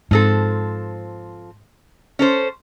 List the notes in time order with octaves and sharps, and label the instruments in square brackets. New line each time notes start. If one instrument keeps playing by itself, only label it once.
[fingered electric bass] G#2 [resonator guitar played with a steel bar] F3 C4 A4
[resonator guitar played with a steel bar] C#4 A4 C5